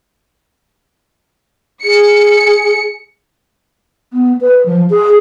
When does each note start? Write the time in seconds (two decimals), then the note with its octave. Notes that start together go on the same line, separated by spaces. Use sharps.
1.84 G#4 C#7
4.13 B3
4.41 B4
4.66 F3
4.90 G#4